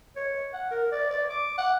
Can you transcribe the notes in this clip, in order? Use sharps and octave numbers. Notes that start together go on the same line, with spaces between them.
C#5
F#5
A#4
D5
D5
D6
F#5